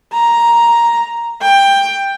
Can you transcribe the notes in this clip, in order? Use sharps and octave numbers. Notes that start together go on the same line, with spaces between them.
A#5
G5